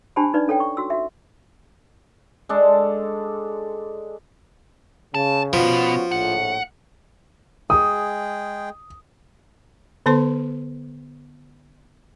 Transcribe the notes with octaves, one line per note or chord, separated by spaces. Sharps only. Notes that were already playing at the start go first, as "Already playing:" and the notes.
D4 G4 C5 G#5 A5 B5
D#4 B4 D5
C#4 A4 C#5 G5
C#6
F#4 E6
F#4 E5
G#3 D4 A4
C#3 A5
B2 F3 B3 C#4 F#4
A#1 A2 F#5
G#3 G#4 G5 D#6
D3 B3 A4 C5 C6